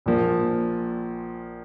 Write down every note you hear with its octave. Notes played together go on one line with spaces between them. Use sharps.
A#1 A#2 F3 A#3